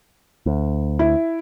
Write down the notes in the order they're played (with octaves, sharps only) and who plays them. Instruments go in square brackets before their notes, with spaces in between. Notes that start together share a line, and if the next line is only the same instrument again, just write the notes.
[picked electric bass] D2
[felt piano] E4